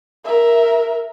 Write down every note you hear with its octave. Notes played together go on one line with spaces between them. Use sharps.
A#4 E5